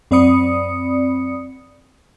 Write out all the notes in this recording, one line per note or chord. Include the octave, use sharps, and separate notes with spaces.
F#2 C4 D5 B5 D#6 C#7